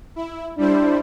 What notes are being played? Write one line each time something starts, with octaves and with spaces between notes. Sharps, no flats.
E4
G3 D4 E4 C5